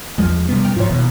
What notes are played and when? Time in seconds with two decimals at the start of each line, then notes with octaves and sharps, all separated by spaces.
0.18 E2 F3 G#3
0.49 C3 G3 B3
0.64 F#2 G5 F6
0.76 G#2 F3 F4 C5 C#5
0.89 D#1 D#2 B2 E3